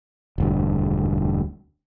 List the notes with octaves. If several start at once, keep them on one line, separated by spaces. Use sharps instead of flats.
E1 D2 G2